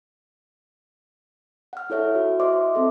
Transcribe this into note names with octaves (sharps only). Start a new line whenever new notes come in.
F#5 F6
E4 A4 C#5 E5
F#4
C5 D#5 E5 C6 D6
C4 A4 E5